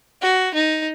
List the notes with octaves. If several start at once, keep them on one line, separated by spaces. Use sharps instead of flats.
F#4
D#4